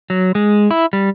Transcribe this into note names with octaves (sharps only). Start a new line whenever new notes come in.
F#3
G#3
E4
G3